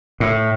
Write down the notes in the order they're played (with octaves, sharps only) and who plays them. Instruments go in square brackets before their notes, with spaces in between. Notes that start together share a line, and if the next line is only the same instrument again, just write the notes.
[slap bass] A2